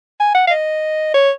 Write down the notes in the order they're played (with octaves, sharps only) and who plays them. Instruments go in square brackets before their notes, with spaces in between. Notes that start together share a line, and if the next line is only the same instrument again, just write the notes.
[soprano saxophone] G#5
F#5
F5
D#5
C#5